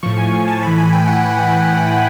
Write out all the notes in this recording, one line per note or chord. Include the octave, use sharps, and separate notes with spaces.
A2 F3 C#6
G#5
A5
A2 E3 B5
G#5
G5
F#5